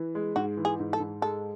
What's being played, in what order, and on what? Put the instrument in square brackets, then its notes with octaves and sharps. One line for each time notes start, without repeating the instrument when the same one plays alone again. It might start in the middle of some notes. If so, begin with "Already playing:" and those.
Already playing: [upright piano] E3
G#3
[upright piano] G#2 [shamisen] F#4
[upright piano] E3
[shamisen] G#4
[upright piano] G#2
[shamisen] A4
[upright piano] G#2
[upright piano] G#3 [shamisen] A4